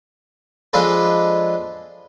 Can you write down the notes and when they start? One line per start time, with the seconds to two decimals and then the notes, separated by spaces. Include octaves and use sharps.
0.73 F3 G#3 D4 F4 A4 B4